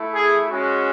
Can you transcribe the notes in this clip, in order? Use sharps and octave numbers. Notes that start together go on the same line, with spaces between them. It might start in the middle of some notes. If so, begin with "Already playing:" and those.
Already playing: A3 E4
G#4
G#3 C#4 F#4